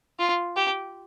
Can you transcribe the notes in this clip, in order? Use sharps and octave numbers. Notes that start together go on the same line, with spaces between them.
F4
G4